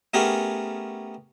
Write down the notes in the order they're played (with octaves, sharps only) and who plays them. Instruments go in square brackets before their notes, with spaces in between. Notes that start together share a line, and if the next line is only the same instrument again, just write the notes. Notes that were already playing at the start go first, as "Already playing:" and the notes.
[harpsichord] A3 B3 C#4 G4 G#4 A#4